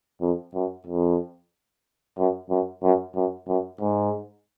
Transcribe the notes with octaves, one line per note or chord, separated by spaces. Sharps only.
F2
F#2
F2
F#2
F#2
F#2
F#2
F#2
G#2